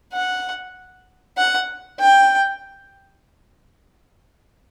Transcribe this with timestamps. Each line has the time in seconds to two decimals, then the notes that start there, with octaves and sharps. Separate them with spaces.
0.13 F#5
1.37 F#5
2.00 G5